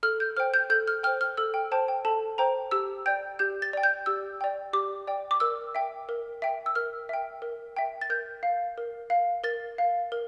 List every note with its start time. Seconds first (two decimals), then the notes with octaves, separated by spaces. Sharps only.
0.03 A4 F6
0.20 G6
0.37 C5 G5 F6
0.54 G6
0.70 A4 G6
0.88 F6
1.03 C5 G5 F6
1.21 F6
1.37 A4 E6
1.54 G5
1.72 C5 G5 A5
1.88 G5
2.05 A4 A5
2.38 C5 G5 A#5
2.71 G4 E6
3.06 D5 G5 G6
3.39 G4 G6
3.62 A6
3.73 D5 G5
3.83 G6
4.06 G4 E6
4.41 D5 G5
4.73 G4 D6
5.07 D5 G5
5.31 D6
5.40 A#4 E6
5.75 E5 G5
6.09 A#4
6.42 E5 G5
6.66 E6
6.75 A#4 F6
7.09 E5 G5
7.42 A#4
7.77 E5 G5
8.01 A6
8.10 A#4 G6
8.43 F5
8.78 A#4
9.10 F5
9.44 A#4 A6
9.78 F5
10.12 A#4